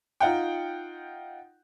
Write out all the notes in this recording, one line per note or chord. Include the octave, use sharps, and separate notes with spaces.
D#4 F4 F#5 G5